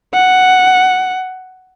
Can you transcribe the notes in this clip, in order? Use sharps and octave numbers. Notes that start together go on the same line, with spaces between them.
F#5